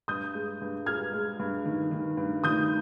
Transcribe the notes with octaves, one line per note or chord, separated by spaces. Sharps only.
G2 D#6 G6
G#3
G2
G#3 F6 G#6
G#3
G2
D#3
D#3
G2
D#3 D#6 G6